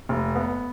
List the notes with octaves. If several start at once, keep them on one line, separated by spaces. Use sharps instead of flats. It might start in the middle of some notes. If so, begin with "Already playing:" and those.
F1
B3